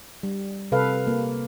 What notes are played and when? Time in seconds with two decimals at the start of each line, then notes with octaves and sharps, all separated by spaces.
0.23 G3
0.72 C3 A4 B4 F5
1.07 A#3